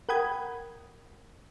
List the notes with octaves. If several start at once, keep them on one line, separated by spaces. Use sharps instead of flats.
A#4 F#5 G5 B5 D#6 G#6